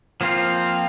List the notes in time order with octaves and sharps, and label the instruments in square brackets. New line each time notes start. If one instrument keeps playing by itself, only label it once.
[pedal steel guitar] F3 A#3 C4 F4